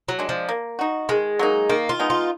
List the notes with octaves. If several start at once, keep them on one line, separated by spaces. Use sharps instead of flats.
F#3
G#3 D4
F3
A#3
D#4 F#4
D#3 G#3
F#3 A#3 D#4
D#3 A#3
F4
G#3 B3 D#4
F4